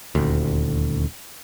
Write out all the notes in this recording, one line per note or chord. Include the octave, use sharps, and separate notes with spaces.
D#1 D2